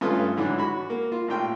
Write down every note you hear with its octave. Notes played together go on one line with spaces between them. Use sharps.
G2 A3 C#4 F4 B4 D#6
G#2 D3 E3 F#3
F#4 B5
A#3
F4
A1 A#2 F4 G5